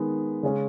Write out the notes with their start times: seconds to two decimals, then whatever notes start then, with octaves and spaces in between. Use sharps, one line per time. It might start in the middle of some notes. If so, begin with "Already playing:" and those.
Already playing: D#3 G#3 B3
0.43 C#3 G#3 C#4